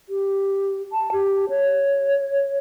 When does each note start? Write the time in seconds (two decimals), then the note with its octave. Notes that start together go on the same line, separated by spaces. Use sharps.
0.09 G4
0.93 A5
1.12 G4
1.50 C#5